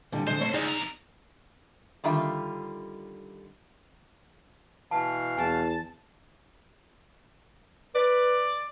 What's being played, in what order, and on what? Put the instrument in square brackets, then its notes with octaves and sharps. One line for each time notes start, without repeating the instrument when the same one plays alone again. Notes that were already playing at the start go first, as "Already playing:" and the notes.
[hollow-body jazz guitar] A#2 D3 G3
[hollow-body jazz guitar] A#2 D3 G#3 [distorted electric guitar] C5
[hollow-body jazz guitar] A3 C#5 C6
[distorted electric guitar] C#2 [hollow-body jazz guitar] D#4 G#4 D5
[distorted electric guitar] B2 A#5
[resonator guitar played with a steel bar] D3 D#3 G3 F4 E5
[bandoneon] B2 E3 F5 [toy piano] A5
[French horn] E2 [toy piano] G#5 [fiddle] A5
[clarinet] B4 [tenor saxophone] D5